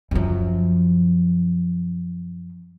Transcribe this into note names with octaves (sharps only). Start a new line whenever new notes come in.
F#2 F3